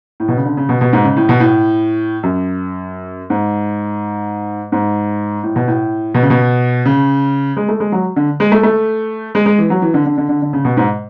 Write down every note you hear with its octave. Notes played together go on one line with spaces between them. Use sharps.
A2
B2
C#3
D3
C#3
B2
B2
G#2
C#3
A2
B2
A2
F#2
G#2
G#2
A2
B2
A2
B2
C#3
B2
C#3
G#3
A3
G#3
F#3
D3
G#3
A3
A3
G#3
G#3
E3
F#3
E3
D3
D3
D3
D3
D3
C#3
B2
G#2